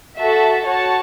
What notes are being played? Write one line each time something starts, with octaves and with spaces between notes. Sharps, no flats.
F#4 A4 E5 A5
F#4 C#5 A5